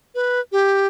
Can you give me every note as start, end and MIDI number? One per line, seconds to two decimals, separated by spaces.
0.15 0.40 71
0.52 0.87 67